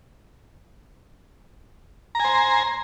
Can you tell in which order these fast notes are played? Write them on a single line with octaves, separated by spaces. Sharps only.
A#5 G#5 C5